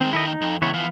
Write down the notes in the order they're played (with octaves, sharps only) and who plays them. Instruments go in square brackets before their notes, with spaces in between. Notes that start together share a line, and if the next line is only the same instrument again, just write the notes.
[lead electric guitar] D#3 G#3 [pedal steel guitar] C4
[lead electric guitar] D#2 D#3 [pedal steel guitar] E4 A4 D#5
[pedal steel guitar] D#4
[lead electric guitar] F2
[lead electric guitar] C#2 [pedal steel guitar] E3 B3 C#5
[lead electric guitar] E3 F3 [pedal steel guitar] B3 F5